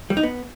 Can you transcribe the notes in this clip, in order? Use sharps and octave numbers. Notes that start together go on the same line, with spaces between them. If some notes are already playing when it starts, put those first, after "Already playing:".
G3
D#4
B3